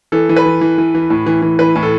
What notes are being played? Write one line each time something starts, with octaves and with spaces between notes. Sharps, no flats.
E3 A4
E3
B4
E3
E3
E3
E3
A2
E3
E3
E3 B4
A2
A4